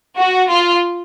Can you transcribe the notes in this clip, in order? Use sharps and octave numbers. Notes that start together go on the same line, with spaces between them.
F#4
F4